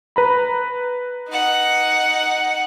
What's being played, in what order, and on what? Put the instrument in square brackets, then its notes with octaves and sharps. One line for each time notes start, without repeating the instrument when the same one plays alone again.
[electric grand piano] B4 A#5 B5
[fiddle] D#4 F#5